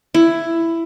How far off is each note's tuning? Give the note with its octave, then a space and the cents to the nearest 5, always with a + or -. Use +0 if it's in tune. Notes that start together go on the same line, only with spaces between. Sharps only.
E4 +10